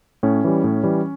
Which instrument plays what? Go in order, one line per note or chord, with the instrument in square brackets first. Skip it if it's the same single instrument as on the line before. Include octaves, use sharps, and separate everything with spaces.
[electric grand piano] A2 C#4
E3 G3
A2
E3 G3